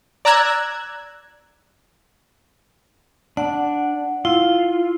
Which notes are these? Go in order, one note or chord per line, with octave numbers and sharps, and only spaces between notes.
D5 A#5 E6 F#6 G#6
D4 F#5
E4 F4